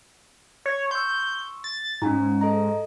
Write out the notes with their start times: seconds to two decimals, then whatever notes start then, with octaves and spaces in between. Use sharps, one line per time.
0.66 C#5
0.91 C6 C#6 E6 G6
1.64 A6
2.02 G#2 C#4 G#5 A#5
2.41 A4 D#5 A#5